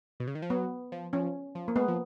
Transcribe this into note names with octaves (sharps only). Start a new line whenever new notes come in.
B2
C#3
D#3
F3
F#3 B3
F3
F3 C#4
F3
A#3
G#3 B3
F3